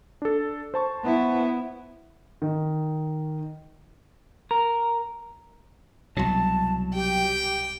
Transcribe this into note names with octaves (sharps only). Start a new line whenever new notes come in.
D4 A4
C5 A5 C#6
B3 E4
D#3
A#4
C2 B2 F#3 A5
G4 G5